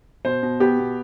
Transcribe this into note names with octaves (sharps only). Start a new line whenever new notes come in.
B2 C5
B2
B3 G4
B2